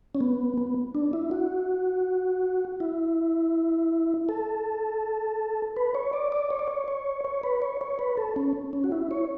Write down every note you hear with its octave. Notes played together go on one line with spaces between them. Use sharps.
C#4
B3
B3
D4
E4
F#4
E4
A4
B4
C#5
D5
D5
C#5
D5
C#5
C#5
C#5
B4
C#5
C#5
B4
A4
C#4
C#4
F#4
E4
C#5